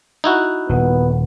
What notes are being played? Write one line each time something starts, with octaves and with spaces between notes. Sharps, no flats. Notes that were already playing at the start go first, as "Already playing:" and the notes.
D#4 E4 F#4
D#1 B3